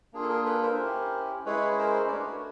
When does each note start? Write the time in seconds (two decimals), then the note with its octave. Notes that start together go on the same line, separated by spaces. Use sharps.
0.13 A#3 D4 F4 G#4
0.22 A4
0.29 G#4 A#4
0.45 A4 B4
0.63 A#4 C5
0.79 C#4 E4 G4
1.46 G#3 C#4 E4 G#4 B4 C#5
1.78 A#4 C5
2.08 D5
2.12 A3 D4 F#4 B4 C#5